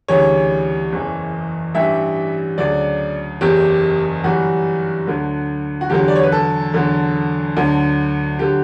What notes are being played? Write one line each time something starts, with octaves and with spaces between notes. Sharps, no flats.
D2 C#3 E3 G3 C#5
F#1 E2 C#3 E3
A1 G2 E3 G3 E5
D2 C#3 F#3 D5
F#1 E2 C#3 G4
G1 F#2 E3 G3 F#4
D2 D3 F#3
F#4
E2 D3 F#3 G4
D5
C#5
B4
A4
E2 D3 F#3
D2 D3 F#3
D3 F#3 G4